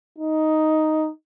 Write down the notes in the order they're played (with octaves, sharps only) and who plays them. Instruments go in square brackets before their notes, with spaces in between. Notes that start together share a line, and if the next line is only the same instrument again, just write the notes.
[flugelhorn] D#4